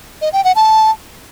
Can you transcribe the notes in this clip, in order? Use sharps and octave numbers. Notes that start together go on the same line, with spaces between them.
D#5
G5
F#5
A5